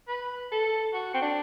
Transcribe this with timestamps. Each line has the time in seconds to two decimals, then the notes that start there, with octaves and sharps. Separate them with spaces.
0.09 B4
0.52 A4
0.94 F#4
1.14 C4
1.22 D4